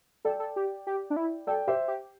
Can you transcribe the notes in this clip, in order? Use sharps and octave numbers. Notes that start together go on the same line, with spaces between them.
A4 D5 G5
A4
G4
G4
D4
E4
A4 D5 G5
G4 C5 E5
G4